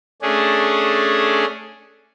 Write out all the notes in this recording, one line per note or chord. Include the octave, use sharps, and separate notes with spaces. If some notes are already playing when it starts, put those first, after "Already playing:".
A3 C#4 D4 G#4